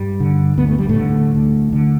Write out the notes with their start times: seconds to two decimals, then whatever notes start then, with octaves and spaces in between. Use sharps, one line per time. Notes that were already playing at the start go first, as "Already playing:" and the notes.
Already playing: G2 G3
0.20 D3
0.57 D2 B3
0.68 A3
0.79 G3
0.89 A2 A3
0.96 D3
1.35 D2
1.73 D3